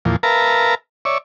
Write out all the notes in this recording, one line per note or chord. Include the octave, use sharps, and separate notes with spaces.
E2 A#2 F3
A#4 B4 E5 F5 A5 A#5
C#5 D5 E5